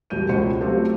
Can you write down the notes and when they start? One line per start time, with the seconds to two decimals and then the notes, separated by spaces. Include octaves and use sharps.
0.10 E1 C2 G6 D#7
0.29 C#2 F#4 C5 C#7
0.61 F#3 A3 C4 F4 G4 A4